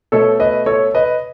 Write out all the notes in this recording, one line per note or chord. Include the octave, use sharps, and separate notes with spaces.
B2 A3 A4 C#5
B4 D#5
A4 C#5
B4 D#5